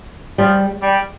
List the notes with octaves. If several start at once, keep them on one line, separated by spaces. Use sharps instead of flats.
F3 G3
G3